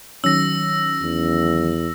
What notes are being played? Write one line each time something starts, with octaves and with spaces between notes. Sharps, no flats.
D#3 F#3 C#4 E6 A#6
E2